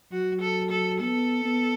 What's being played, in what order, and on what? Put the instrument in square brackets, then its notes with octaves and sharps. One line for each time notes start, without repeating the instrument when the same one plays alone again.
[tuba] F#3 [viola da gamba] F#4
[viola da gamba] A4
A4
[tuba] B3 [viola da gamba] A4
[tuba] B3